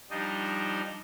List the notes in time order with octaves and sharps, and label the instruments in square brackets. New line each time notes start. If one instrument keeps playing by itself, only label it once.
[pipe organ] F3 G3 D4 D#4 C5 D#5